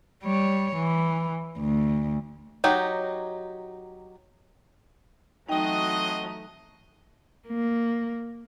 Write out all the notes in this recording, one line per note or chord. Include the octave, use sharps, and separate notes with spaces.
G3 C#5
E3
D2
F#3 D#4 G4
E3 F#3 A3 C4 D#4 F#4 D#5 G5
A#3